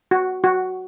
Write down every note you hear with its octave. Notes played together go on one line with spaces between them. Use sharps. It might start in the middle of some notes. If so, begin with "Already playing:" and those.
F#4
F#4